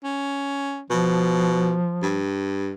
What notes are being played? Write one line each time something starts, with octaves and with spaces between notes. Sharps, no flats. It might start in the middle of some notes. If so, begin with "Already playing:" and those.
C#4
B2 F3
G2